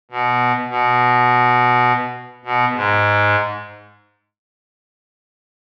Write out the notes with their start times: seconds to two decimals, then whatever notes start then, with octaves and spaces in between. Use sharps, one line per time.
0.11 B2
0.70 B2
2.45 B2
2.74 G#2